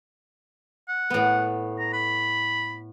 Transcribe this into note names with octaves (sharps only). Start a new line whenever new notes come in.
F#5
A2 B3
A#5
B5